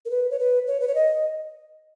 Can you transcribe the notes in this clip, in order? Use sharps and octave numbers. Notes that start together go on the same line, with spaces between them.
A#4
B4
C#5
B4
C#5
B4
C#5
D#5